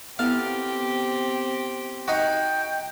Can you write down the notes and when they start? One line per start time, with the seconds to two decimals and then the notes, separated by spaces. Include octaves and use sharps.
0.19 B3 C4 E4 G4 A4 F5
2.08 D#4 F#4 G5